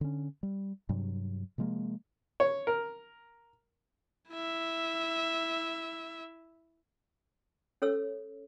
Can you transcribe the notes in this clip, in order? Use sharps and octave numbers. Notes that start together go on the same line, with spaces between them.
D3 C#4
G3
G2 C3 F#3
C3 F3 G#3 A#3
C#5
A#4
E4 E5
C#4 A4 C#5 E6